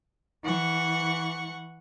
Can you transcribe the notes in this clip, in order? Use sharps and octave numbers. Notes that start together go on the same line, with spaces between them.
E3 F#5 C#6